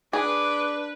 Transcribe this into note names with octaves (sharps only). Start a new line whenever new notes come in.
D4 G#4 B4 D6